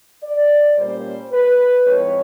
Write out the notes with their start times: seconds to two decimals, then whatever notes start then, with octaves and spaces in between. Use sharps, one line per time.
0.23 D5
0.77 A#2 G3 A#3 C#4 C5
1.31 B4
1.86 A2 F3 G#3 C4 C#5